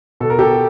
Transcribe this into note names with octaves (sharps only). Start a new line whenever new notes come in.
B2 A4
A#4
G4 A4